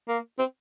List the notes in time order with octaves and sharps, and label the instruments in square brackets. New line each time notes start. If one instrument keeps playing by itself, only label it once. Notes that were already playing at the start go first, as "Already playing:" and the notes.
[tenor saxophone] A#3
C4